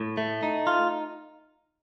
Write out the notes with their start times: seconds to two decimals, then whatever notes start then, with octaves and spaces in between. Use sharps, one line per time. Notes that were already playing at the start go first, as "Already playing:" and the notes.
Already playing: A2
0.17 A3
0.43 D#4
0.67 F4